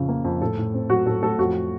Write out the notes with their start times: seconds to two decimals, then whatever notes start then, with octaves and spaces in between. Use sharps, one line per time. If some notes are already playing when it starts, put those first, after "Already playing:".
Already playing: F2 C#3 F3
0.09 A#3
0.24 F2
0.41 A2 A4
0.58 A2
0.74 C4
0.90 F#3 F#4
1.06 A2 A4
1.23 A2 A4
1.38 F2 F#4